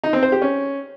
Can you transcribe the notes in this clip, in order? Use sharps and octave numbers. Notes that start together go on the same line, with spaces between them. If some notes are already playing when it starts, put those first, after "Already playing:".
D#4
C4
C5
G4
C#4